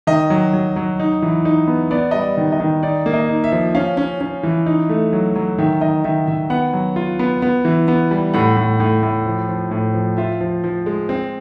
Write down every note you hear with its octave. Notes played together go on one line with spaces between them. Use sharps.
D#3 D#5
F#3
F#3
F#3
D#4
E3
D#4
B3
B3 D5
G3 D#5
D5
D#3
D#5
D#3
D#4 D5
A#3
D#5
D#4
E5
F3
C#4 F5
C#4
C#4
E3
D#4
A3
F#3
F#3
D#3 E5
D#3 D#5
D#3 E5
D#3 E5
B3 F#5
F#3
F4
B3
B3
E3
B3
G3
A2 F#5
A2
A2
A2
F3
F3
A2
F3
F4 E5
F3
F3
G#3
C4